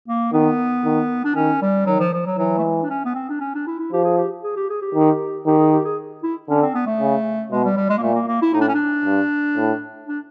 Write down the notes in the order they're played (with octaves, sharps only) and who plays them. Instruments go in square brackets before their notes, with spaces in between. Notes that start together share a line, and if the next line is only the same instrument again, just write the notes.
[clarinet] A#3
[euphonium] D#3 [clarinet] B3
[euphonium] D#3
[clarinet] D4
[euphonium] D#3 [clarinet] C#4
[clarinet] G3
[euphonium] D#3 [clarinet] F#3
[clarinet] F3
F3
F#3
[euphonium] E3 [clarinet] F#3
[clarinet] A3
G#3
D4
C#4
B3
C4
D4
C#4
D4
E4
E4
[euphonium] F3 [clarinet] G4
[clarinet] G#4
G4
G#4
G4
G#4
G4
[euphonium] D#3
[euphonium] D#3 [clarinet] G4
[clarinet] G#4
G4
G#4
E4
[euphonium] D3 [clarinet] C#4
[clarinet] C4
B3
A3
[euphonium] C#3
[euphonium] B2 [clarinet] G#3
[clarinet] G3
G3
G#3
A#3
[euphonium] A#2 [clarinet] A3
[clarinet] A#3
A#3
E4
[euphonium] A2 [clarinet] D#4
[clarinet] D4
C#4
D4
[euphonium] G2
A2
[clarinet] D4